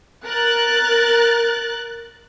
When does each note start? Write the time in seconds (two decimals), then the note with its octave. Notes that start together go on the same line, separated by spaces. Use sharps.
0.25 A#4 F#6 A6